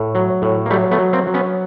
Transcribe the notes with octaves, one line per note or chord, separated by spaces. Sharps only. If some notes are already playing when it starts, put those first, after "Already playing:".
Already playing: A2
F#3
A2
A#3
F#3 G3 A3
A3 B3
F#3
A#3 C4
F#3
B3 C#4